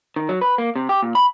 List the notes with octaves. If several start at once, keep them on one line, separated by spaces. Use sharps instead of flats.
D#3
F#3
B4
A#3
C3
G4
A#2
B5